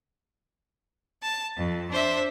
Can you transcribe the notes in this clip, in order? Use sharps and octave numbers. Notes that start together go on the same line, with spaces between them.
A5
F2
D4 C5 E5